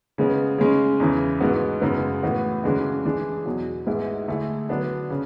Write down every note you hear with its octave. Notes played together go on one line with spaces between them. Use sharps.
C#3 G#3 B3
C#3 G#3 C#4
E2 C#3 E3
G#2 G#3 B3 F#4
F#2 C#3 G#3 B3
A2 E3 B3 F#4
C#3 E3 G#3 D4 F#4
E3 G#3 D4 G#4
E2 B2 F#3
G#2 G#3 B3 E4 G#4
D3 A3 E4 G#4
D3 F#3 B3 D4
C#3